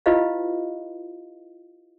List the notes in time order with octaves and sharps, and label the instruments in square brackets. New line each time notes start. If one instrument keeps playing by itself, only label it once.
[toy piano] E4 F4 G4 B4 D#5 F5